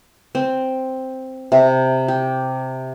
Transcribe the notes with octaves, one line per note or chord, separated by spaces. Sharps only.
C4
C3
G4